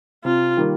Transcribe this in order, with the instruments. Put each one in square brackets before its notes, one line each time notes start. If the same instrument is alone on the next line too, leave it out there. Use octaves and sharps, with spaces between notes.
[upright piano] C3 [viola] F4
[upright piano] D#3 G3 A#3